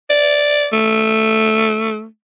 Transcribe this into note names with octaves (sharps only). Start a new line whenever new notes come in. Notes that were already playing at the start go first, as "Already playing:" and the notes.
D5
A3